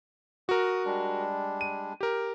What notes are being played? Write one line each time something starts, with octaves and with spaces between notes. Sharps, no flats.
F#4 A#4 D#6
G3 G#3 D4
D#7
G4 A#4